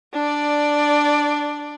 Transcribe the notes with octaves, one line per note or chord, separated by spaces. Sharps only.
D4 D5